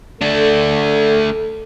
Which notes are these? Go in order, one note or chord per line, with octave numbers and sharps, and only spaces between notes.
A3 D4 A4